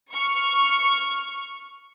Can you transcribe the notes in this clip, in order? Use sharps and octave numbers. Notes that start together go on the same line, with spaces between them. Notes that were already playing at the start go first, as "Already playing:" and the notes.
C#6 F6